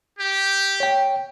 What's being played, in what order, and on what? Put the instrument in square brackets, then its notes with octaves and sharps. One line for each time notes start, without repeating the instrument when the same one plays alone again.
[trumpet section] G4
[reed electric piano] C#5 G5